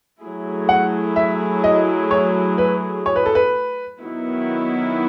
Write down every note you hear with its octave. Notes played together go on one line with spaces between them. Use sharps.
F#3 A3 E4 G#4
F#5
E5
D#5
C#5
B4
C#5
B4
A4
B4
D#3 F#3 B3 E4